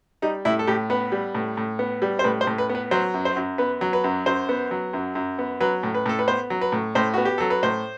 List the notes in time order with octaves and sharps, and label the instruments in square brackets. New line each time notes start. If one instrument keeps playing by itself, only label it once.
[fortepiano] G3 D#4
A2 E4
A4
A2 G4
B3 B4
G3
A2
A2
B3
G3
C5
A2 B4
C5
A2
B4
B3
B4
F#3 C5
F#2
C5
F#2
B3 B4
F#3
B4
F#2
F#2 C5
B3
F#3
F#2
F#2
B3
F#3 B4
A2
B4
A2 A4
B4
B3 C5
F#3
B4
A2
A2 C5
B3 F#4
G4
F#3 A4
B4
A2 C5